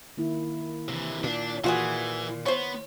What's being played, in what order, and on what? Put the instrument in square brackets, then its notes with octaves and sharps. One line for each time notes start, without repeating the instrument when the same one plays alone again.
[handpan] D#3 A#3 E4
[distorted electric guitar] C3 E3
[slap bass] A#2 [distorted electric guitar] D4
[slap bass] A#2 [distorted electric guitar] E3 [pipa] F4 F#4 G#4
[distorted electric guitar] B3 [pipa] C5 C#5